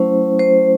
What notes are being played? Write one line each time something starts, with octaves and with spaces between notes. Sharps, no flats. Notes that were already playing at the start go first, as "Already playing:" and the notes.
Already playing: F#3 A3 C#4 E4 C5
C5